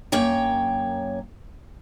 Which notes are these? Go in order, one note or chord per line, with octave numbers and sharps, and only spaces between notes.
F#2 A#3 C#5 G5